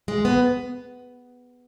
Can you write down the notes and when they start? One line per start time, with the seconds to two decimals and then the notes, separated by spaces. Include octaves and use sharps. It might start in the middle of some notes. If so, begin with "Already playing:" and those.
0.08 G#3
0.25 B3